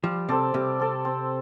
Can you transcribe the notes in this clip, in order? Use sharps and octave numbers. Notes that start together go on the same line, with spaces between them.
F3 G3
C3 C4 A4 D5
C3 G3
C4 A4 D5
C4